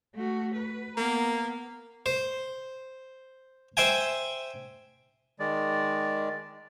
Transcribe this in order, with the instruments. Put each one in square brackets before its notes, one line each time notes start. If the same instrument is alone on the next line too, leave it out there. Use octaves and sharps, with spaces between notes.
[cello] A3 F#4
B4
[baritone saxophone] A#3 [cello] B3 [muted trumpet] A#5
[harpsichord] C5
C5 E5 G5 G#5
[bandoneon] D#3 G#3 D5